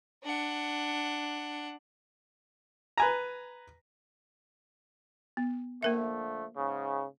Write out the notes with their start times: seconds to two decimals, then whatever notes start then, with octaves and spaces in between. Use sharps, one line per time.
0.24 D4 F#5
2.97 B4 G#5 A#5
5.37 B3
5.83 D3 F3 A3 A#3 A#4 E5
6.56 G#2 C#3